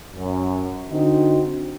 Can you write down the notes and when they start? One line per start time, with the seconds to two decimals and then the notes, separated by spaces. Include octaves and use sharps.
0.13 F#2
0.89 D3 C4 D#4 F#4